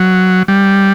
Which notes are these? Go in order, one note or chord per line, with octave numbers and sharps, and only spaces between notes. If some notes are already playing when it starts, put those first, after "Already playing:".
Already playing: F#3
G3